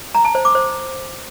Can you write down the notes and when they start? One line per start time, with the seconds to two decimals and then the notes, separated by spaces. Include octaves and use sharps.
0.15 A#5
0.25 A5
0.35 C5
0.45 D6
0.55 C5